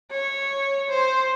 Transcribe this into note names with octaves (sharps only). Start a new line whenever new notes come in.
C#5
C5